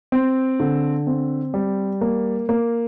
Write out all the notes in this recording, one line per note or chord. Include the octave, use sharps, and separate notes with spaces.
C4
D3
C4
G3
A#3
A#3